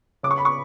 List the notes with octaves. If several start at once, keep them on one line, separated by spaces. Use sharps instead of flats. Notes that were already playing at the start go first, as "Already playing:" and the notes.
C#3 D6
C#6
B5
C#6